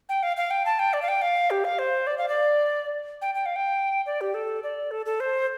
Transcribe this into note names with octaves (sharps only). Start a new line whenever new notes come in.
G5
F5
F5
G5
A5
G5
D5
F5
G5
F5
G4
F5
C5
D5
F5
D5
G5
G5
F5
G5
D5
G4
A4
D5
A4
A4
C5